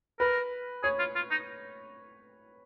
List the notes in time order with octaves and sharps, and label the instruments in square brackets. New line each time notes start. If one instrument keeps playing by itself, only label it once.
[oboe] A#4 [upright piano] B4
[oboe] G#4 [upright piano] C#5
[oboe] F4
F4
D#4